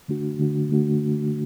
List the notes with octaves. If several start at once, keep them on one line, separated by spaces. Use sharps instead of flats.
D3 A3 D4 F#4
D3 A3 D4 F#4
D3 A3 D4 F#4